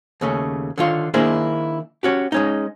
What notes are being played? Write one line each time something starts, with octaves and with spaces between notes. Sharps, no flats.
D#2 C#3 A3 C#4
D3 D#3 F4 C#5
D#3 A#3 D4 E4 G#4 C5
C#4 F#4 G4
G#3 C#4 D#4